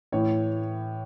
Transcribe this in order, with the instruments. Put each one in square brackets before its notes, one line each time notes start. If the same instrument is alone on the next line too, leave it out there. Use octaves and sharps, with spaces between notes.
[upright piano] A2 E3 C#5